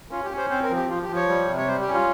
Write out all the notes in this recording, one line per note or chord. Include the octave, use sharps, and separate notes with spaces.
C#4 F4
G4
C#4
C5
C4 C5
A#4
F3
G4
F3 F4
G4
F3
C#5
G3
C3
C#5
G3 C5
G4
C#4
F4